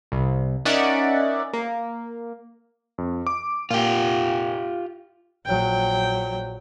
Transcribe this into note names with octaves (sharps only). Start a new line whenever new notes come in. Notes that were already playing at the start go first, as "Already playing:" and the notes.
C2
C#4 D#4 A#4 D5 E5 F#5
A#3
F2
D6
A#2 F4 G4
A#1 F#3 G5